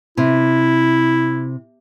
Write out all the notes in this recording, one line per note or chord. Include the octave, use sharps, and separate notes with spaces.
C3 E4